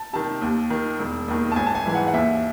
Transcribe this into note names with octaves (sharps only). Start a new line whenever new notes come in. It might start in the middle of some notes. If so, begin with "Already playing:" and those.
Already playing: A5
C3 D#3 A5
D#2
D#3
E1
D#2 D#3
A5
G#1 G#5
A5
G#5
G#2 E3 G#5
F#5
F#5
D#2 E5